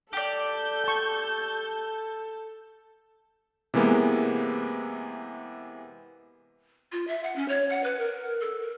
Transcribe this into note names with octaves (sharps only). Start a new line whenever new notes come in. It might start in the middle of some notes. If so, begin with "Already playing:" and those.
G4 A4 D5 G6
A5 C#6
C3 E3 G#3 A#3 B3
F4
E5
F#5
C#4
C#5
F#5
B4
A#4
A4
A#4